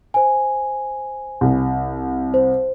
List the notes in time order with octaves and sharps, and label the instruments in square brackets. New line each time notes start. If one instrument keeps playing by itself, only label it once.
[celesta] C5 G#5
[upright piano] C2
[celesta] C5